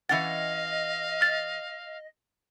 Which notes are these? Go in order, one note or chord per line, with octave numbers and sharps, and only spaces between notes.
E3 C#4 D#5 F5 F#5 A6
F6 A6